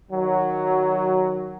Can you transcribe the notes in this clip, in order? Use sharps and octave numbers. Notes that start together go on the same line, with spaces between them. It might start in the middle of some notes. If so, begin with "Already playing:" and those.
D#3 F#3